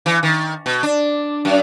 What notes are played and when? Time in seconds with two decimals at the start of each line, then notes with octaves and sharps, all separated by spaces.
0.06 E3
0.23 D#3
0.66 B2
0.83 D4
1.45 F#2